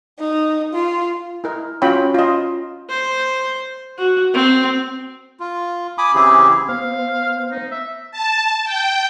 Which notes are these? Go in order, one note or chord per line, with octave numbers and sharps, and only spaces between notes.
D#4
F4
E4 A#4 D#5
C#4 F4 F#4 C#5 G5 B5
F4 D#5
C5
F#4
C4
F4
G#5 B5 D6 D#6
C#3 E3 C4 E4 G4 G#4
B3 C5 F5
D#4
E5
A5
G5